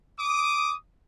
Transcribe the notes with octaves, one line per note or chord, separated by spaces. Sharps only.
D6 D#6